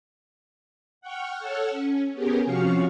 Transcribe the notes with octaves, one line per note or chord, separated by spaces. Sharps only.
F#5 G5 C#6 F6
A4 C#5 F#5 E6 F6
C#4
B3 C#4 G4 G#4 A#4
C3 F3 C#4 F#4 F5 C#6